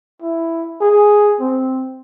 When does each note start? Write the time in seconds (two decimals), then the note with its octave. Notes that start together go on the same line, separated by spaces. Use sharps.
0.22 E4
0.81 G#4
1.40 C4